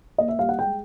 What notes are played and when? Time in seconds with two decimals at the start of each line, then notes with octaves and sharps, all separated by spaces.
0.18 A#3 D#5
0.28 E5
0.39 G3 F5
0.49 F#5
0.59 G#3 G5